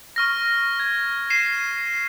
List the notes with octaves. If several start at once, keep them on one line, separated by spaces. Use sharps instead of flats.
C#6 F6 A#6
G#6
C7 D#7 E7